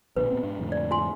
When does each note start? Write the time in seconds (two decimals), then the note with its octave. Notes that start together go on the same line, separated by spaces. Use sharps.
0.16 A#1 B2 D3 B4
0.30 A#2 B3 C4
0.43 G#2 D4
0.59 F2 A2 D3
0.72 D5
0.91 F#4 G#5 C6